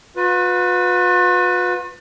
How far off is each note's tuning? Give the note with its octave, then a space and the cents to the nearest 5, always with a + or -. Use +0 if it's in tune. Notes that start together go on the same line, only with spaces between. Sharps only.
F4 +45 B4 +5